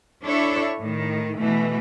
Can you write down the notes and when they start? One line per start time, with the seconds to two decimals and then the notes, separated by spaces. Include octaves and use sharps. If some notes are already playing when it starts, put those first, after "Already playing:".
0.25 D4 E4 A4 C#5 E5
0.80 A2 D#3
1.38 B2 E3 A3